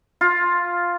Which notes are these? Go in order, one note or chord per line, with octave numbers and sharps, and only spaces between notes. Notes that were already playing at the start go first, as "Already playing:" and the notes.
F4